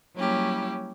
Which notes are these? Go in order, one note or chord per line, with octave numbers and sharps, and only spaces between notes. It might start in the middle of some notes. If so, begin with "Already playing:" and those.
F#3 G3 A#3 C#4 E4 G4